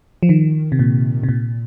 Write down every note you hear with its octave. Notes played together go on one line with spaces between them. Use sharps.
F3
D#3
C3
A#2
C3
A#2